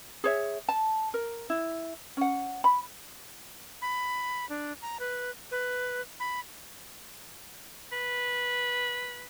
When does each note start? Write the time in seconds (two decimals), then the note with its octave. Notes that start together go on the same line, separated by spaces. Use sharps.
0.24 G#4 C#5 E5
0.69 A5
1.14 A#4
1.50 E4
2.17 C#4 F#5
2.64 B5
3.82 B5
4.49 D4
4.82 A#5
5.00 B4
5.51 B4
6.20 B5
7.92 B4